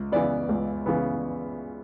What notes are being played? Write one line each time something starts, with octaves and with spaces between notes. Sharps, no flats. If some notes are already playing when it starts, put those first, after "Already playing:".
Already playing: C#2
C#3 E3 B3 D5
C#2
C#3 E3 B3